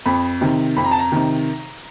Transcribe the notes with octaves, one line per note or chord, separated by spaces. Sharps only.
F2 B5
C3 D#3
F2 B5
A#5
A5
A#5
C3 D#3